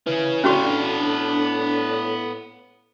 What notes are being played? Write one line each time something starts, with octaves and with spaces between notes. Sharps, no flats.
C#3 E3 C#4
A2 B3 C#4 D4 F#4 F5 C#6